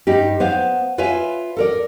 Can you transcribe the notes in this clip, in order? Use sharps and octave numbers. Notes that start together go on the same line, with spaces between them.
G2 D#4 G4
B3 C5 F5
F4 B4 C#5 E5 F5 G#5
A4 A#4 D5